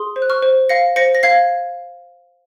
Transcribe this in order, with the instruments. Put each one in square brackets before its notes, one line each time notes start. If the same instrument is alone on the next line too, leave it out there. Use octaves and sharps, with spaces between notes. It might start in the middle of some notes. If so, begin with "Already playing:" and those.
Already playing: [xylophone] G#4 C6 D#6
C5
F#6
C#6 F6
C5
F5 A#6 C#7
C5 A#6 C#7
A#6
F5 G#6 C7